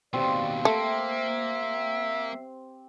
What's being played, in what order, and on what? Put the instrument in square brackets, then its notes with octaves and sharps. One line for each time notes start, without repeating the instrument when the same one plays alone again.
[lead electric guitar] D#2 B2 [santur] C4 G4 F5 [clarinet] D5
[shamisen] A3 [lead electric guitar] A#3 [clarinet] E5